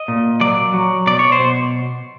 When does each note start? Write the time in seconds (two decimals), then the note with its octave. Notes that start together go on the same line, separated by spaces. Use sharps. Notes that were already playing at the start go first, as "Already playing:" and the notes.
Already playing: D#5
0.08 A#2
0.41 F#3 D5
0.74 F#3
1.07 B2 D5
1.19 C#5
1.32 C5
1.40 B2